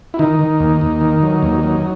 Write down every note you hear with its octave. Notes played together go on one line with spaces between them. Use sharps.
E4
D#3 D#4
D#3
D#2
D#2
D#3
F#3
D#2
F#3